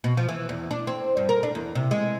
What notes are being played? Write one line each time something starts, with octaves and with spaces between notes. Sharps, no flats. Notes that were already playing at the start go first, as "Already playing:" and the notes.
B2
F3
E3
E2
D4
C4
G2
A#4
D4
E2
C3
G#3